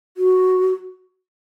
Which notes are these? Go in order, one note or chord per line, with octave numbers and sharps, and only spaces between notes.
F#4